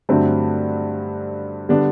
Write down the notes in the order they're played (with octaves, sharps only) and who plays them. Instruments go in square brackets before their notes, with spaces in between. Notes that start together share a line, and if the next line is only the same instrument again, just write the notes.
[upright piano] G2 D3 F#3 A3 C4
D3 G3 B3 D4